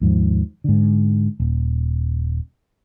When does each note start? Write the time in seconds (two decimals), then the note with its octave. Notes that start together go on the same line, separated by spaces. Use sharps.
0.01 D#2 G#2 F3
0.64 G#2 D3
1.40 D#1